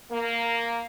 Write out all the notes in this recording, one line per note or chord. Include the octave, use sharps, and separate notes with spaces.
A#3